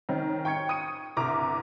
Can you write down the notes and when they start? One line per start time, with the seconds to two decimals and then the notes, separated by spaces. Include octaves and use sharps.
0.09 D#3 C4 C#4 D#4
0.45 G5 C#6 G#6 C#7
0.69 D#6 C#7 D#7
1.17 G1 C2 A#5 D6